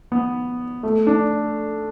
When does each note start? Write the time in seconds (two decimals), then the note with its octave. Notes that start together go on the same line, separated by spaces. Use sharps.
0.12 B3
0.83 A3
1.07 D4